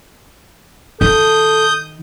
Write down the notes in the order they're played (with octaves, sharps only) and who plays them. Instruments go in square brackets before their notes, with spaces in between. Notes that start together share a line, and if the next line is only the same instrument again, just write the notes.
[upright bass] D#3 [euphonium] A4 [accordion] D#6 G6